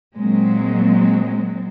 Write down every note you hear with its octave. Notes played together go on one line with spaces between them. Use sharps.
A#2 F#3 G#3 C4